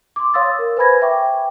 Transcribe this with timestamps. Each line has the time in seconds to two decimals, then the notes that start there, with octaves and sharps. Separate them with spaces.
0.16 C6 D6
0.34 C#5 F5 C6 D#6 E6 A6
0.59 A#4
0.77 B4 C5 G#5 B5 G#6 A#6
1.02 E5 G5 C#6 D6